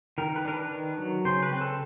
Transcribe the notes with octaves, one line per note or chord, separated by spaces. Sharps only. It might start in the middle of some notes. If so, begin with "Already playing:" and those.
D#3 A#4
B4
D4 A#4
B4
D#3
F#3
C#3 C5
B4
C4
A4